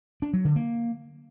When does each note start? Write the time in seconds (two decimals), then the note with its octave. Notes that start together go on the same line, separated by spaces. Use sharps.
0.22 D4
0.33 F#3
0.45 D3
0.56 A#3